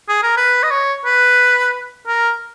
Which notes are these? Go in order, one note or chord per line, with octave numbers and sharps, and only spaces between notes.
G#4
A#4
B4
D#5
C#5
B4
A#4